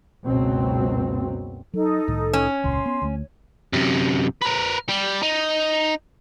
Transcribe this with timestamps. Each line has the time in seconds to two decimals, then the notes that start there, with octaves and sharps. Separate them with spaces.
0.25 F#1 C#2 B2 F#3 C4
1.74 F#3 D#4 A4
2.08 C2 A2 D#3
2.33 C#4
2.64 E1 C#2 A#2 C6
2.86 B3
3.02 D2 A3
3.73 F#2 C3
4.42 A#4 B4
4.88 G3
5.23 D#4